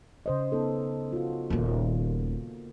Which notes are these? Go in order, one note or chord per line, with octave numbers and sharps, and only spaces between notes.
C#3 C5 D#5
B3 D#4 A4
F4 F#4
D#1 D#2 A#3